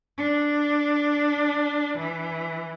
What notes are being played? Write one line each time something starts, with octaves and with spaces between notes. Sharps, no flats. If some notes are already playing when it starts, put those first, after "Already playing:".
D4
E3